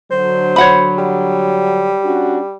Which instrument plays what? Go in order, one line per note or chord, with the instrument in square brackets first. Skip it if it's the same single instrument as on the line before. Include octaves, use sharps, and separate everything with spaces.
[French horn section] D3 F#3 [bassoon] C5
[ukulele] C#5 F#5 B5
[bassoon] G3
[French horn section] C#4 D4 F#4